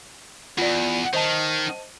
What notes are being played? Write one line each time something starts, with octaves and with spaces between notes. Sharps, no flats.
E2 F4 D5
D#3 C5 D#5 A5